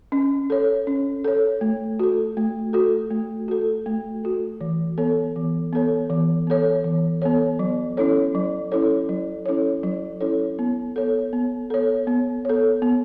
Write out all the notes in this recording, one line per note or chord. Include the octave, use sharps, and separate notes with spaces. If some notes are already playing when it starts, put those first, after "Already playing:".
C#4
A4 C#5
C#4
A4 C#5
A3
F#4 A4
A3
F#4 A4
A3
F#4 A4
A3
F#4 A4
E3
B3 A4 C#5
E3
B3 A4 C#5
E3
B3 A4 C#5
E3
B3 A4 C#5
F#3
C#4 E4 A4 C#5
F#3
C#4 E4 A4 C#5
F#3
C#4 E4 A4 C#5
F#3
C#4 E4 A4 C#5
B3
A4 C#5
B3
A4 C#5
B3
A4 C#5
B3